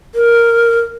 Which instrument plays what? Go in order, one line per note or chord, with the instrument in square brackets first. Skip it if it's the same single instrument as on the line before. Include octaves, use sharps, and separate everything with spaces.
[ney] A#4